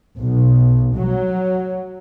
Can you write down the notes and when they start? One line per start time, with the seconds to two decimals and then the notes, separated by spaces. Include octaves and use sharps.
0.17 B1
0.95 F#3